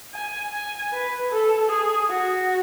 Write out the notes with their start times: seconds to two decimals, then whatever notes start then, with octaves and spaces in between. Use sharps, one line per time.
0.13 G#5
0.53 G#5
0.93 B4
1.31 A4
1.70 G#4
2.09 F#4